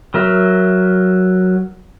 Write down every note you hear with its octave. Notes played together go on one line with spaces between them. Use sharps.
F#3 A#4 E5